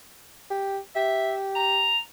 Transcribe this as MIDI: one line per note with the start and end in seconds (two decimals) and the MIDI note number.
0.50 0.78 67
0.96 1.90 67
0.96 1.35 76
1.56 2.00 82